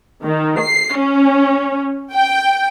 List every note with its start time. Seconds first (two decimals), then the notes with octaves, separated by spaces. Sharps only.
0.22 D#3
0.61 C7
0.95 C#4
2.14 G5